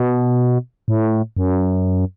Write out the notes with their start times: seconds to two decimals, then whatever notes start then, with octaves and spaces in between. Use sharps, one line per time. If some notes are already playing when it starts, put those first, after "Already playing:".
Already playing: B2
0.88 A2
1.37 F#2